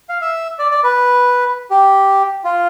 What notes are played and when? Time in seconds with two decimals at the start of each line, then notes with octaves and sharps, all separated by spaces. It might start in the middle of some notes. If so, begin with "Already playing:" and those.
0.09 F5
0.22 E5
0.59 D5
0.71 D5
0.84 B4
1.70 G4
2.44 F4